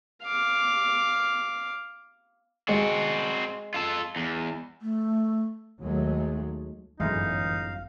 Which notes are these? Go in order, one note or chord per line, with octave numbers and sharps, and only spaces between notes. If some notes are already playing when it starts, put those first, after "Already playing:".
F5 D6
G#3 C4 F#4
F4 A4
E2
A3
D#2 F#3 G#3 A3
G1 F#2 A2 E3 G#3 D#4 F5